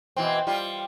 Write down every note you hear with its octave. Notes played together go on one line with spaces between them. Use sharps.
B2 E3 C4
G3 F4